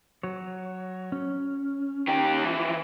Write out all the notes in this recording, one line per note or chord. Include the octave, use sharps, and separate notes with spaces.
F#3 C#5
C#4
D#3 G4
E3 F3